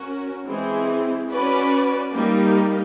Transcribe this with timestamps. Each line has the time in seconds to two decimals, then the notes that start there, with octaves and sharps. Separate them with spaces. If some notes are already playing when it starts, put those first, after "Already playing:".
Already playing: C#4 F#4 A#4
0.46 E3 G#3 C4 E4 G#4
1.29 C#4 F#4 B4 D5
2.12 G3 A#3 D#4 G4